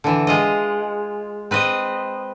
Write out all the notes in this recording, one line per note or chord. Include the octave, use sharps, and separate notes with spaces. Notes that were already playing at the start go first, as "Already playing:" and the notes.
D3 E3
G#3 F4 D#5
C4 B4 C5 D#5